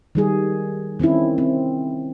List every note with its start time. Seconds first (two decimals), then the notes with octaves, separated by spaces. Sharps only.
0.15 D#3 G3 G#4
0.99 D#3 C4 C#4 E4
1.38 C4